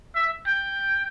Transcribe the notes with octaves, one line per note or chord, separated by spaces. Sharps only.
E5
G5